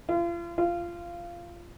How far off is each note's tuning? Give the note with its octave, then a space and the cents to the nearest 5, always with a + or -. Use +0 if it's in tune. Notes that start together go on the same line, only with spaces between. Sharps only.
F4 -35
F4 -15